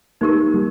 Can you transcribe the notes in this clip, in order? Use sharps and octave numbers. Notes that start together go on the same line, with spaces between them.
A#3 D#4 G4 A#4
G3